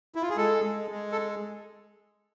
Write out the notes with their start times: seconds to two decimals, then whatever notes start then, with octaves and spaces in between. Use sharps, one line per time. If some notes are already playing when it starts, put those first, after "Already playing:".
0.15 E4
0.22 F4
0.30 G#4
0.37 G#3 A4
0.63 G#3
0.91 G#3
1.12 A4